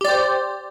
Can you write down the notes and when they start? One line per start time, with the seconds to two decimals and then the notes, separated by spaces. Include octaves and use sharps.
0.01 G4
0.05 D5
0.08 C5